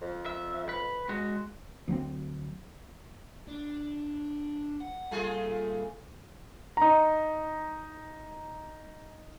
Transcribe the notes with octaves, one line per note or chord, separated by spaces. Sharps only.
F2
E5
B4
G#3 F#4
D2 F#3 A#3 C4
D4
F#5
A#2 G3 A3 F4 G#4
D#4 A#5